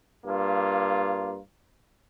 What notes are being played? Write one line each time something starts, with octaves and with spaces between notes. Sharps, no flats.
G2 A#3 F4